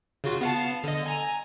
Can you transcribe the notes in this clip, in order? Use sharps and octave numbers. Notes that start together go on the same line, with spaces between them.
C#3 F4 F#4
B3 F5 A5
D3 D#5
G#5 A#5